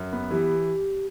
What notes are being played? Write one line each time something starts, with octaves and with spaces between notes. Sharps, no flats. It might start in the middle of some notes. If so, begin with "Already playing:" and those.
Already playing: F#2
B3
E3 G4